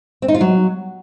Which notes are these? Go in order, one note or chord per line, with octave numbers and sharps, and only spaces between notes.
C4
D#4
F4
F#3